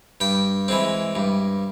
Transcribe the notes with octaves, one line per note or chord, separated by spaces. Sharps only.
G2 G5
E3 G#3 C4
G2